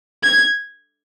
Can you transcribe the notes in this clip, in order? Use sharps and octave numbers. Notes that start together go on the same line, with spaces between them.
G#6